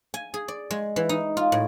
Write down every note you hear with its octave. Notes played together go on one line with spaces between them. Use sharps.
G#5
G#4
D5
G#3
E3
D#4
F4
A2